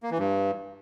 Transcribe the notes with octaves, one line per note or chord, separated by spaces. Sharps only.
A#3
E3
G2